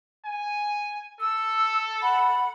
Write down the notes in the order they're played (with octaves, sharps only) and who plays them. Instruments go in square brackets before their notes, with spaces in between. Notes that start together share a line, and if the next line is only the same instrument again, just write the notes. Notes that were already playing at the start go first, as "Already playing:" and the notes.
[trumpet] G#5
[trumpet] A4 [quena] E6
[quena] F#5 [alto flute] B5